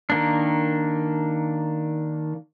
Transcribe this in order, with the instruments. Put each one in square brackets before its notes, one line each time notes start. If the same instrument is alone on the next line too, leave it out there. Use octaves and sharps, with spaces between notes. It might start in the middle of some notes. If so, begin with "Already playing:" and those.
[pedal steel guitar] D#3 A#3 D4